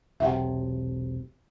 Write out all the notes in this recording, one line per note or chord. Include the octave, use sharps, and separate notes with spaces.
E1 B1 C3 E5 F#5 G5